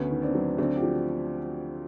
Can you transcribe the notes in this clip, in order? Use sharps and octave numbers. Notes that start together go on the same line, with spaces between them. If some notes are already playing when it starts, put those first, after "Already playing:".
Already playing: D2 B3 C#4
D#3
C4 D4
F#3
D2 C4 D4
F4 G4
F3